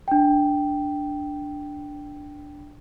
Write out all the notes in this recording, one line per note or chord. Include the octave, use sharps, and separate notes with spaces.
D4 G5